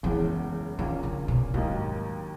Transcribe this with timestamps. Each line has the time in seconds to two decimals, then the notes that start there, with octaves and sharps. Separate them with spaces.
0.03 F#1 E2 C#3 E3 G#3
0.78 A#1 A#2 D#3 A#3 C#4
1.03 C#3
1.28 B2
1.54 D#2 G#2 D#3 F#3 A#3 D#4